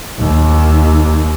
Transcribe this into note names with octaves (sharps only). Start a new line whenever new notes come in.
D#2